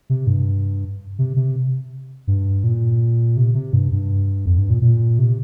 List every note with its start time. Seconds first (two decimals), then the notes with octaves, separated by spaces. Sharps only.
0.10 C3
0.27 G2
1.19 C3
1.37 C3
2.27 G2
2.64 A#2
3.37 C3
3.55 C3
3.73 G2
3.92 G2
4.46 F2
4.58 G2
4.70 A#2
4.82 A#2
5.19 C3